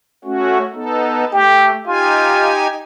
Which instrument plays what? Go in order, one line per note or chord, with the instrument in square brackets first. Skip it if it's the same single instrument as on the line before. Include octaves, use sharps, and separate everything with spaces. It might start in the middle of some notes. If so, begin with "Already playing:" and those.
[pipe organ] A3 C#4 F#4
B3 D#4 A4
[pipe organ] A3 [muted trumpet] G4
[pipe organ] D#4 G4 G#5 [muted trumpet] F4